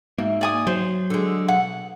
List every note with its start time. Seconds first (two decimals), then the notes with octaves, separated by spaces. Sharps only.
0.18 G#2 A#3 F#4 E5
0.41 D5 G#5 D#6
0.67 F#3 C5
1.10 D3 G#3
1.48 B2 F#5